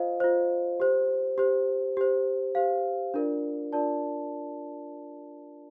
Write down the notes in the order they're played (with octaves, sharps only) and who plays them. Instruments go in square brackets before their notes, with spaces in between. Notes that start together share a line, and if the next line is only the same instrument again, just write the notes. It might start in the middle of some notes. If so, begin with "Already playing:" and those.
Already playing: [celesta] F4 C5 D#5 F5
F4 C5
G4 C5
G4 C5
G4 C5
G4 C5 F5
D4 F4 A#4 D5
D4 F4 A#4 D5 A5